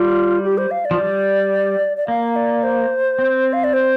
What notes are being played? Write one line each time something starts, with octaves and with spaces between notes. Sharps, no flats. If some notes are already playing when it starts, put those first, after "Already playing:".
Already playing: G3 F4
G4
C5
F5
D5
F3
G3
D5
A#3 F5
D5
C5
C4
F5
D5
C5